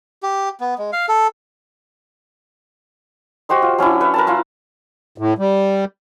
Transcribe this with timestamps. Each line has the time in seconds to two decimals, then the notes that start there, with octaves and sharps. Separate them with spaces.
0.23 G4
0.60 B3
0.78 G#3
0.93 F5
1.09 A4
3.49 F#4 G4 C5 D#5
3.62 F4
3.78 F#3 C#4 D4 E4
4.01 B4 C#5 E5
4.14 A#4 B4 A5
4.27 E4 F4 F#5
5.18 A2
5.38 G3